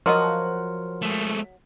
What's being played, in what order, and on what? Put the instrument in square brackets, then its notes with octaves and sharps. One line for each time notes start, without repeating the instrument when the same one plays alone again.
[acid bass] F3 [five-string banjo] F#3 F#4 D#5 [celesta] A#4 C6 F6
[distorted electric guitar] G#3 A3